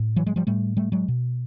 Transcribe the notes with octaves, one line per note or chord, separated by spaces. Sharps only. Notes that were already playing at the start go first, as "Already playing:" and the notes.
Already playing: A2
E3 F#3
F#3 G#3
F3 G3
A2 G3 A3
G3 A3
F#3 G#3
B2